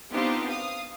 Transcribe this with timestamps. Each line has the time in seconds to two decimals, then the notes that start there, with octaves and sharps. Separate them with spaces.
0.11 B3 C4 D4 D#4 F4 G4
0.48 F5 D#6